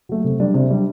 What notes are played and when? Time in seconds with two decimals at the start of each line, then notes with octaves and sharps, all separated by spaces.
0.09 F#3 A3
0.24 C3
0.40 G3 D4
0.54 C3
0.71 G3 D4